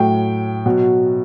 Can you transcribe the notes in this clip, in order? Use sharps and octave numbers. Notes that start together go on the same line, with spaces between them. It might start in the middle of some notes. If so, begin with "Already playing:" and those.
Already playing: A2 F#3 G5
B2 F#3